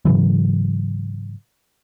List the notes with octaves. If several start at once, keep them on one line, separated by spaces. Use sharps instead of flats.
G#2 C#3 E3 F#3